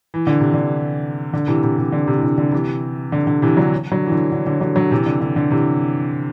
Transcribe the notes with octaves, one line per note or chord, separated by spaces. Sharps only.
E3
D3
C3
D3
D3
C3 E3
C3 E3
C3
D3
C3
E3
D3
D3
C3 E3
D3
D3
C3 E3
D3 F#3
D3 F#3
E3
D3
D3
D3
D3 F#3
D3 F#3
C3 E3
D3
D3
D3
C3 E3